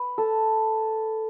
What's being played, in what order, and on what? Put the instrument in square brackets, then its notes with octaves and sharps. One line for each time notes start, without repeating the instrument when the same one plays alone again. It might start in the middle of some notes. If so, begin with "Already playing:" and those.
Already playing: [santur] B4
A4